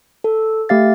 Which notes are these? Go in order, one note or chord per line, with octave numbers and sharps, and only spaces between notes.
A4
A3 G4 F5 A6